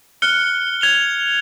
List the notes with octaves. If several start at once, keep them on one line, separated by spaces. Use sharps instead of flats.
F6 F#6 C#7 G7
G#6 F7 G7